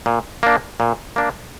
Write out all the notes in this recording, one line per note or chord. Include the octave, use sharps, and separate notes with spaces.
A#2
A#3 D4
A#2
A#3 D4